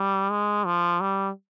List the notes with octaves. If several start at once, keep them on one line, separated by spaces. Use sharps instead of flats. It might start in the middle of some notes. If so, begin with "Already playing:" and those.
Already playing: G3
G#3
F3
G3